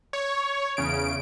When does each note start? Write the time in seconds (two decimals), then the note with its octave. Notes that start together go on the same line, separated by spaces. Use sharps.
0.13 C#5
0.77 E2 C#3 D7